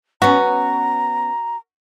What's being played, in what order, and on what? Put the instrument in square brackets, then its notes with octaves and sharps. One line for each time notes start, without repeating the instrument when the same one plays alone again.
[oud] B3 C#4 [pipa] F#4 [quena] A#5